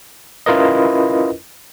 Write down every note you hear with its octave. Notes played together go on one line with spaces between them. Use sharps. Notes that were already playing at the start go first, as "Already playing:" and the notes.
C#4 E4 F4 A#4 B4 D#5